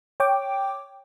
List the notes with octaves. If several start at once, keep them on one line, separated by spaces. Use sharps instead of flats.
C#5 G5 D6